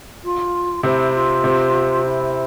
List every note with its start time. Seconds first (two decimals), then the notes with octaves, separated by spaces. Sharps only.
0.24 F4
0.83 C3 C4 E4
1.14 F4
1.44 C3 C4
2.04 E4